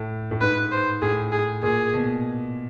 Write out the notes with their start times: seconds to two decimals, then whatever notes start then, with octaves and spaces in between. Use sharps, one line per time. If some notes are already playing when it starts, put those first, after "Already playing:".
Already playing: A2
0.31 A2
0.41 G#2 B4
0.72 C5
1.02 A2 G#4
1.32 G#4
1.63 A#2 G#4
1.93 B2